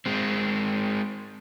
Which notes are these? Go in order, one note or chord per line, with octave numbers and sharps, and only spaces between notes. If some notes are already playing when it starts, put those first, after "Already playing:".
G#3 C4